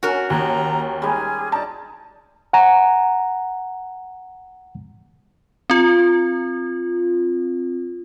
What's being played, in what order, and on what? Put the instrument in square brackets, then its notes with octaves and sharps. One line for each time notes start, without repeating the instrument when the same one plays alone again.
[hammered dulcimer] C#4 [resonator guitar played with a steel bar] F#4 A#4
[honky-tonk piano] D#2 [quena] A#5
[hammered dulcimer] G3 G#3 D#4 [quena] G#4
[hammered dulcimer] D#4 [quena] D5 [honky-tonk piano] A5
[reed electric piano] F#5 G#5 A#5
[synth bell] C4 F4